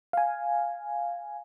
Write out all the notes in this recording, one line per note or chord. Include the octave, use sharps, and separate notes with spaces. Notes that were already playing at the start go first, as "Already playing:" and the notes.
F5 G#5